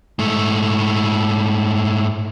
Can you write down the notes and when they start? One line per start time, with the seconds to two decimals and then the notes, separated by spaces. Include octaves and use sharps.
0.19 G#2 A3